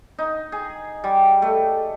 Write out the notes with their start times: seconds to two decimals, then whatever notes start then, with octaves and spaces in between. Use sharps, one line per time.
0.19 D#4
0.52 G#4
1.04 G3
1.42 A3